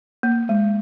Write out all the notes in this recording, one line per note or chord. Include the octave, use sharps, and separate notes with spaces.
A#3
G#3